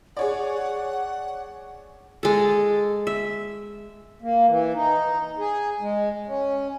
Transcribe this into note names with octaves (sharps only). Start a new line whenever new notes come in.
G#4 C#5 D5 F#5
G#3 A4
E5
A#3
E3
D#4
G#4
G#3
C#4